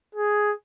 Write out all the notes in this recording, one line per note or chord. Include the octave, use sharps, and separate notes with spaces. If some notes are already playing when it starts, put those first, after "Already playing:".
G#4